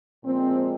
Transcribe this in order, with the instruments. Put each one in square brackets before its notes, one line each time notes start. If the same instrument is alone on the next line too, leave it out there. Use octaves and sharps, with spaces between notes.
[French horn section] A#2 F3 G#3 C4